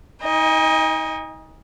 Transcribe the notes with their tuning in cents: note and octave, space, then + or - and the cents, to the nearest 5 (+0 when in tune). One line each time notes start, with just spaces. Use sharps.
D#4 +40 D#5 +10 G#5 -45